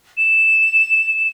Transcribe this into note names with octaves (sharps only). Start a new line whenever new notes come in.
E7